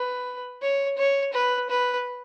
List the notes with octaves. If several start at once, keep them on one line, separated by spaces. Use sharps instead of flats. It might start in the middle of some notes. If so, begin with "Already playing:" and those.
Already playing: B4
C#5
C#5
B4
B4